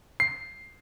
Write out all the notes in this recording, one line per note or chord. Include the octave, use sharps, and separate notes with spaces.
C7